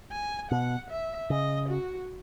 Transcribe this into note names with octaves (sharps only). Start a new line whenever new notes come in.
G#5
B2 F#5
E5
C#3 D#5
F#4